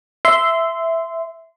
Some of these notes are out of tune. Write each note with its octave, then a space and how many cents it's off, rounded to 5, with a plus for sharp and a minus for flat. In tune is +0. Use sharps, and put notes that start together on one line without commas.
E5 +0 C6 -15